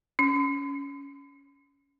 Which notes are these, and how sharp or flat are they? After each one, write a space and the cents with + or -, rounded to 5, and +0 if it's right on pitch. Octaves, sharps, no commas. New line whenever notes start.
C#4 +15